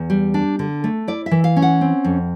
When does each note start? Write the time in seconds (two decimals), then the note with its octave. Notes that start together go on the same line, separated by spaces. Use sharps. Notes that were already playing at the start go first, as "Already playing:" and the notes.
Already playing: E2
0.10 G3
0.34 D4
0.59 D3
0.84 A3
1.08 E4 D5
1.26 E5
1.31 E3
1.44 F5
1.57 C#4
1.62 F#5
1.81 C4
2.04 F2